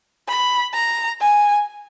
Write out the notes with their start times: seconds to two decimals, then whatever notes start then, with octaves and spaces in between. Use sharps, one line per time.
0.28 B5
0.74 A#5
1.21 G#5